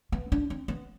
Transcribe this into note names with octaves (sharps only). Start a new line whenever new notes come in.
B3
D4
C4
B3